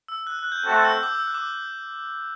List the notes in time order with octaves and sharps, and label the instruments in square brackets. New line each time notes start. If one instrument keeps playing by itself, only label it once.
[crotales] E6
F#6
F#6
G6
[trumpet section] A3 C4 F#4 A4 [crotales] F#6
[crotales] E6
D6
E6
F#6
D6